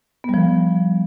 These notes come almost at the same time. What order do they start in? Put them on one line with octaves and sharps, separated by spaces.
B3 G3 F3